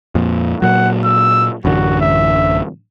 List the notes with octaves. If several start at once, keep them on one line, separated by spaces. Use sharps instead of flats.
F2 A#2
A#2 F#3 F#5
E6
A1 F#2 D3 F#4
E5